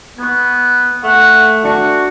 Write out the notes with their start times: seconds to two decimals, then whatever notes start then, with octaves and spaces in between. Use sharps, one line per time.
0.18 B3 C#6 G#6
1.04 A3 F#5
1.64 D4 F#4 A5 C#7